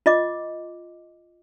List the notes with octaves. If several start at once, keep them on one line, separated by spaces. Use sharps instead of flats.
F4 D#5 D6